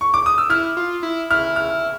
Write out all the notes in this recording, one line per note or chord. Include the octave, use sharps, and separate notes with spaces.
C#6
D6
D#6
E6
E4 F6
F4
E4
E4 F6
F6